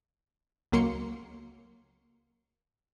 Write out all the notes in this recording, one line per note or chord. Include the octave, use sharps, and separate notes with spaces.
C#2 F#3 A#3 C6 C#7